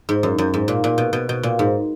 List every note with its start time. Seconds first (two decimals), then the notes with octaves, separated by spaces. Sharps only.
0.09 G#2
0.23 F#2
0.38 F#2
0.54 G#2
0.68 A#2
0.84 A#2
0.98 B2
1.13 B2
1.29 B2
1.43 A#2
1.59 G#2